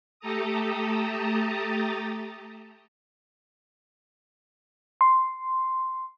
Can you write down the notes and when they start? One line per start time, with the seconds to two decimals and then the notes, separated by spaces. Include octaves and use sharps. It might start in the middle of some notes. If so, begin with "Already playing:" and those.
0.20 A3 G4 A4 A5 A#5 D#6
5.01 C6